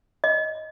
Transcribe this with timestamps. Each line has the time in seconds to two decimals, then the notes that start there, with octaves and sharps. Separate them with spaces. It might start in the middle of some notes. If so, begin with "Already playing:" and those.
0.24 D#5